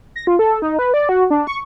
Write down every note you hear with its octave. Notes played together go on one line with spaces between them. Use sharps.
A#6
F4
A4
D#4
B4
D5
F#4
D4
C#6